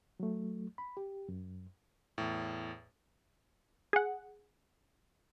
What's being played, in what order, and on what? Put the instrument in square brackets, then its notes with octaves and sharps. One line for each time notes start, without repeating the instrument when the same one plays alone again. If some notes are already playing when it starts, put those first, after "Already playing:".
[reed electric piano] F#3 A3
B5
G4
F#2
[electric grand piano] E2 A2
[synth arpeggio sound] G#4 F#5